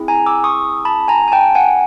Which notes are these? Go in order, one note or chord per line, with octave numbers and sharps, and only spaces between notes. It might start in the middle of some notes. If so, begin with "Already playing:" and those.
Already playing: C4 E4 G#4
G#5 A#5
D6 E6
C#6 D#6
A5 B5
G#5 A#5
G#5
G5 A5
F#5 G#5